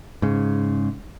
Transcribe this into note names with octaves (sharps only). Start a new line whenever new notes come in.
G#2 C#3